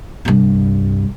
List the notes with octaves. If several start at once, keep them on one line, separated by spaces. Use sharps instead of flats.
C2 G2